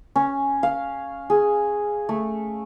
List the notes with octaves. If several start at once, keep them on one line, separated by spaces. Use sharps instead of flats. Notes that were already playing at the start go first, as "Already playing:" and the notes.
C#4
F5
G#4
A3